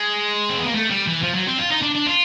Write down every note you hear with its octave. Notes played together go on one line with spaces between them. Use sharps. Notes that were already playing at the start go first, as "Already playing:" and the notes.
Already playing: G#3
C4
B3
A#3
A3
G3
E3
F3
F#3
C4
F4
D#4
D4
D4
F4